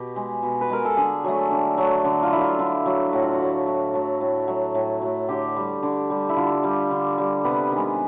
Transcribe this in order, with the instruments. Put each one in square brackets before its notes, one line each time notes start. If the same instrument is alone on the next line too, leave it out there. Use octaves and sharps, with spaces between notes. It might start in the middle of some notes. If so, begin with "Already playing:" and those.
Already playing: [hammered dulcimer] B2 G4
G#3
B2
B4
G#3 A#4
A4
D3 G#4
F#3 A3
D3
F#3 A3
D3
F4
F#3 A3 E4
F4
D3 E4
F#3 A3
A2 F#4
F4
F#4
F#3 A3
A2
F#3 A3
A2
F#3 A3
A2
F#3 A3
D3 G4
G3
D3
G3
E4
D3 F4
G3
D3
G3
C3 B3
D#3 G#3